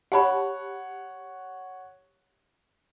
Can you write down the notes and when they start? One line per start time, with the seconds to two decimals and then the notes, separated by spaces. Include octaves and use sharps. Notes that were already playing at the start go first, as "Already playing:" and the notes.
0.12 G4 C#5 F#5 A5 B5